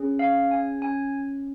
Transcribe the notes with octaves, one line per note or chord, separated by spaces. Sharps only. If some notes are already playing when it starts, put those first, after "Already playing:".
Already playing: C#4 G#4
F5
G#5
C#4 G#5